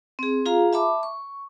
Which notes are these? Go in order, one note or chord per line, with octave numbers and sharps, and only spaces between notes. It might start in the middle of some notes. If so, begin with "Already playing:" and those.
C4 G#4
F4 G#4 F5 A#5
E5 A5 B5 D6
C#6